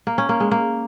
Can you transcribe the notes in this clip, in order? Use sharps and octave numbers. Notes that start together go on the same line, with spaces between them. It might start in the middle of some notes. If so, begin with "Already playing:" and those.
A#3
C#4
A#3
G#3
A#3